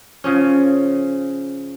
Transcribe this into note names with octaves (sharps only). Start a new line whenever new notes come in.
C#3 F3 C#4